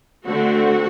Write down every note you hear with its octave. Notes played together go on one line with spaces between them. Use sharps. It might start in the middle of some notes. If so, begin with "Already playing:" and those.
D3 A3 C4 F#4